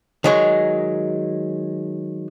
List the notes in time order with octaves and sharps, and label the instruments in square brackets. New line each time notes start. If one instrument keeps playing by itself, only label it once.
[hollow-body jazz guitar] D#3 F#3 G#3